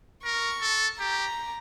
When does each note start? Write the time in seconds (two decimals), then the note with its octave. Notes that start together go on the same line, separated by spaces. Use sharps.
0.24 A#4 C#6
0.61 A4
0.99 G4 A#5